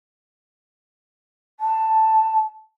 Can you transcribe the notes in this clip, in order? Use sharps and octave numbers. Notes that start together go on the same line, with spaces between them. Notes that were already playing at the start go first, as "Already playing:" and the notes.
A5